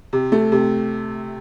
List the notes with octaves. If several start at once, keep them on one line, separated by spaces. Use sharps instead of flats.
C3
A3
C3